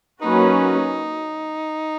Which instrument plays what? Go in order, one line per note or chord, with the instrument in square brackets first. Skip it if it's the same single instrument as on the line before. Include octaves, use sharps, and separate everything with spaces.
[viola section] F#3 A#3 C#4 F#4 B4 [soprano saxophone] D#4